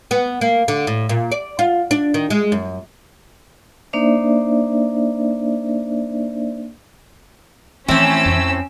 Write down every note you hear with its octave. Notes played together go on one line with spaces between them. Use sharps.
B3
A#3
D3
A2
A#2
D5
F4
D4
D#3
G#3
F#2
A#3 D4 D#4 C5 D5 E5
A2 E3 F3 A3 C4 C#4 E6
F2